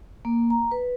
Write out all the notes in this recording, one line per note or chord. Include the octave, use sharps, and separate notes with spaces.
A#3
A#5
B4